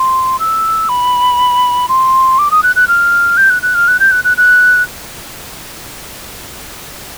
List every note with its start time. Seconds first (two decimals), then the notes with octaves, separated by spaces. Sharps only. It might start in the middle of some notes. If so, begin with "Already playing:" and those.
Already playing: C6
0.40 E6
0.89 B5
1.89 C6
2.39 D6
2.51 D#6
2.63 F#6
2.76 F#6
2.88 F6
3.37 G6
3.50 F#6
3.63 F#6
3.75 F6
3.88 F#6
4.00 G6
4.11 F#6
4.24 F#6
4.37 F#6